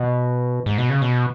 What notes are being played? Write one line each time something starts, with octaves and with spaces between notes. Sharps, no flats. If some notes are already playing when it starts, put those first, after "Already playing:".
Already playing: B2
G#2
B2
C#3
B2